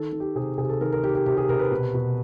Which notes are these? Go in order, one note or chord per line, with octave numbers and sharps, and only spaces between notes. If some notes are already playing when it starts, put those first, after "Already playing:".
Already playing: D#3 A4
D#3
G4
C3 G#4
C3 G#4
A4
D#3 A#4
A#4
D#3 G4
G4
C3 G4
G#4
C3 A#4
B4
B2
B2